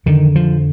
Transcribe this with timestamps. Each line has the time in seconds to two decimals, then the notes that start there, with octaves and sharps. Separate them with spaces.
0.06 F2 D3 D#3
0.35 F3